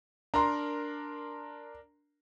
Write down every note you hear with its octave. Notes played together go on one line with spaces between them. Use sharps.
D4 A#4 A#5 C6